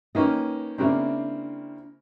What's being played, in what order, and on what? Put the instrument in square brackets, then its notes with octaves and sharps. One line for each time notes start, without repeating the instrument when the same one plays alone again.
[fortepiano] D#3 A#3 C#4 [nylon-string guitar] B4 D#5
[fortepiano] C#3 A#3 C4 [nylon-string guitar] D4 E4